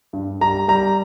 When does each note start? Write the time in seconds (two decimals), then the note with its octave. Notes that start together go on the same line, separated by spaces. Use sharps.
0.13 G2
0.41 G3 A#5
0.68 G3 A#5